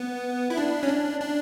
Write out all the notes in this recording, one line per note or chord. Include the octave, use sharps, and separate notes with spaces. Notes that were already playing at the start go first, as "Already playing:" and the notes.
Already playing: B3
E4
D4
C#4
D4
D4